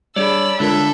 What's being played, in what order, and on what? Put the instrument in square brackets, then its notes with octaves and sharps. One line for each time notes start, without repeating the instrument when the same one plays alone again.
[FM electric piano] G3 D4 G#4 [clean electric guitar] C#5 D5 [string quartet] A5 B5 [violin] E6
[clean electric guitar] D3 [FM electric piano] G#3 F4 A#4 [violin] A4 E5